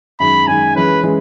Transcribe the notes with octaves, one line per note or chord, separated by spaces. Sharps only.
F#2 D#3 G#3 B5
F#2 D#3 G#3 G#5
E3 G#3 C#4 B4
E3 G#3 C#4